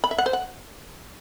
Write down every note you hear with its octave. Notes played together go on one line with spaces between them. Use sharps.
B5
E5
F#5
C5
F#5